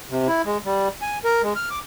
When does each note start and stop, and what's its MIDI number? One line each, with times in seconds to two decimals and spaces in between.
0.11 0.28 48
0.28 0.42 64
0.46 0.58 56
0.65 0.88 55
1.02 1.18 80
1.24 1.42 70
1.44 1.53 56
1.56 1.69 89
1.71 1.79 86